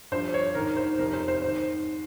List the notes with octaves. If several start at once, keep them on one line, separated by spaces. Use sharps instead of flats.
G2 F3 C5
C#5
G#2 D#3 A#4
C5
F2 C3 D#3 A#4
C5
C5
G#2 D#3 C5